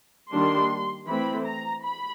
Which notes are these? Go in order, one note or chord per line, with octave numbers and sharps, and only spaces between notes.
D#3 G3 A#3 D4 C6
E3 A3 C4 B5
A#5
B5